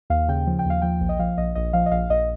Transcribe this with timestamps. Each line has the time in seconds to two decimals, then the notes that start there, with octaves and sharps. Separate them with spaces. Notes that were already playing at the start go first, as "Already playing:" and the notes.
0.10 D#2 F5
0.28 C#3 G5
0.47 F3
0.59 G5
0.65 D#2 F5
0.82 F3 G5
1.01 A#1
1.09 D#5
1.19 F3 F5
1.37 A#1 D#5
1.55 A#1 D#5
1.73 F3 F5
1.86 D#5
1.91 A#1 F5
2.10 A#1 D#5